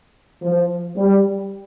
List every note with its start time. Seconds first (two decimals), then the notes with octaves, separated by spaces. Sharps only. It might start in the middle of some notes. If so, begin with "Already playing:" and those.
0.43 F3
0.97 G3